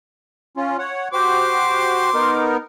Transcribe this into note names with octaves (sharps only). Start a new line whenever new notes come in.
C#4 F4
C#5 F#5
F#4 G4 C5 C6 D6
B3 D#4 A#4